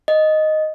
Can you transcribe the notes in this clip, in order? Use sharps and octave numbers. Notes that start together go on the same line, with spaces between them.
D#5